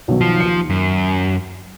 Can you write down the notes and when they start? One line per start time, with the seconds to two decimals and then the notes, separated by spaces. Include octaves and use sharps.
0.08 B1 D#3 F#3
0.21 F3
0.40 D#2 C#7
0.70 F#2